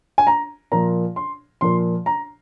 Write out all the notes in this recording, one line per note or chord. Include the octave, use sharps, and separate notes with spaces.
G#5
A#5
A#2 F3 A#5
C6
A#2 F3 C6
A#5